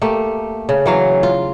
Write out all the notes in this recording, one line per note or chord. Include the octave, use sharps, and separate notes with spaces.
A3 A#3 G4
C#3
E3 F#3 F5
F4